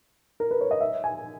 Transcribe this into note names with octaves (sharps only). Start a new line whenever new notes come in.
A#4
B4
C#5
D#5
E5
G#5